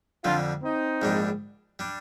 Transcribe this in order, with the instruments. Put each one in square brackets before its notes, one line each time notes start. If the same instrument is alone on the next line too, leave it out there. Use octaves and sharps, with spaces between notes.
[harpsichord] F2 D3 G3 [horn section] D4 F4
[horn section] C4 D#4
[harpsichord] A#1 G#2 G3 D4
G3 D4